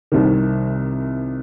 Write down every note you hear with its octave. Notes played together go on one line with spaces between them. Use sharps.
C2 C3 D#3